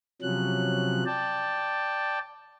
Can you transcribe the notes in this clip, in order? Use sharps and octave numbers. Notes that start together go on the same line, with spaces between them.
C3 F3 F#3 C#4 F#6
D5 G5 A5